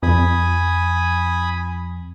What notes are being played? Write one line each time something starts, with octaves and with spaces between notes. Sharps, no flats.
F2 G#5 B5 D#6